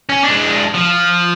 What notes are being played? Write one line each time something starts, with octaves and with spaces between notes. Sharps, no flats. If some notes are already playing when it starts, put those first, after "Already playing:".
C#4
G#3 D4
F3